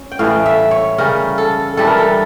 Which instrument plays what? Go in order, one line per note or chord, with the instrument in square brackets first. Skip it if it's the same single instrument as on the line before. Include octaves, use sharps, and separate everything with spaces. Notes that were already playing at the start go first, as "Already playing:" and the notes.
Already playing: [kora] C#4
G5
A2 E3 G3 F5
E5
C#5
C#3 G3 C#4 A#4
A4
G2 E3 G3 D4 A4
A#4
A4